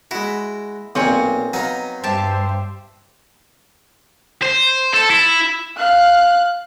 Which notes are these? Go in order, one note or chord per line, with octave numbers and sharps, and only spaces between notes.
G#3 E4 F#4
B1 A#2 C4 C#5 G#5
F#3 B3 D#4 F5 A#5
G2 G4 C5 E5 A5
C5
A4
E4
F5 F#6